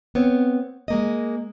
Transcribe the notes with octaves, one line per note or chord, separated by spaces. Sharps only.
B3 C4 C#5
G#3 A#3 D#5